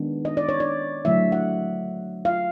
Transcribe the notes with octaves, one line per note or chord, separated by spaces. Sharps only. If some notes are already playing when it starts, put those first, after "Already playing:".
Already playing: D#3 G#3 B3 D4
D#5
D5
C#5
D5
D3 F#3 A3 E5
F#5
F5